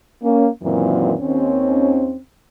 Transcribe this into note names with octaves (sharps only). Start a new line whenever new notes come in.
A#3 C#4
F#2 A#2 D#3 E3 F#3 C4
D#2 C4 C#4